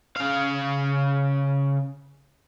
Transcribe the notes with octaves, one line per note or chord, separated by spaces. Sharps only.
C#3 F5